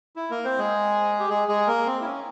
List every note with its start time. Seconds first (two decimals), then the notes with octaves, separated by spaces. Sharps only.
0.16 E4
0.31 A#3 A#4
0.45 C4 C5
0.58 G#3 G#4
1.20 G4
1.29 G#3 G#4
1.48 G#3 G#4
1.67 A#3 A#4
1.86 C4
2.01 E4
2.05 C#4